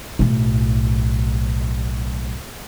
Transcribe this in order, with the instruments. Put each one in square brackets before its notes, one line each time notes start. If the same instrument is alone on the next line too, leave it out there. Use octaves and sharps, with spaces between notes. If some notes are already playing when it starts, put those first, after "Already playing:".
[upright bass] B1 A2